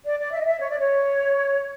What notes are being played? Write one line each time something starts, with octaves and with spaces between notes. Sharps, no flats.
D5
D5
E5
D#5
E5
C#5
D5
C#5